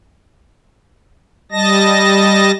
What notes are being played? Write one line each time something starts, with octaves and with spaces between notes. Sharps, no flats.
G3 D#5 A5 A#6